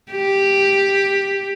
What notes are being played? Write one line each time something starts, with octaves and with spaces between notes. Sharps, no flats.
G4